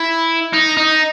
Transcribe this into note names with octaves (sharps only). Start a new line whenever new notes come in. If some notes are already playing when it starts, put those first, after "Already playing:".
Already playing: E4
D#4
D#4